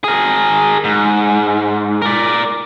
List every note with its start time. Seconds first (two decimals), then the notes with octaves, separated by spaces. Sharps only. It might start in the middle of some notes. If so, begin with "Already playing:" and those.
0.04 G#4 A#4
0.84 G#2
2.02 A#4 D5